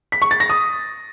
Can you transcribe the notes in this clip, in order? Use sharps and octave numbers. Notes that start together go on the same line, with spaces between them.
B6
C#6
A6
A#6
D#6